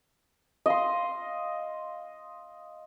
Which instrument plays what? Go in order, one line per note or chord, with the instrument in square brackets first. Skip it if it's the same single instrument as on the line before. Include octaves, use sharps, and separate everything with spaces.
[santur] D#5 F5 C6